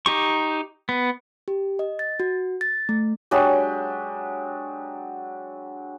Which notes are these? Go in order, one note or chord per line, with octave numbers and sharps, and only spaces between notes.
D#4 G4 C#6
B3
G4
D#5
A6
F#4
A6
A3
F#3 G#3 D4 G4